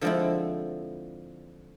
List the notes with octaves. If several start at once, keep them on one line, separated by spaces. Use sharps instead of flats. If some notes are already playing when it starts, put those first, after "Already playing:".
D3 F3 G#3 C4 E4